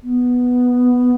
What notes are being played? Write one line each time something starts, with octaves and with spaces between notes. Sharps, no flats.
B3